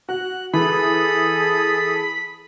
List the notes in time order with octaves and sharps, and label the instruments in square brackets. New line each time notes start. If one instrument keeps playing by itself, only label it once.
[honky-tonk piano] F#4 [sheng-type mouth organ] F#6
[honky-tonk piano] E3 [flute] G#4 [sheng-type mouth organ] A4 D#6 [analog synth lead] B5